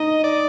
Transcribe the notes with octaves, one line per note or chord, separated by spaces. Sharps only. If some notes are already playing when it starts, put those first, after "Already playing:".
Already playing: D#4 D#5
D5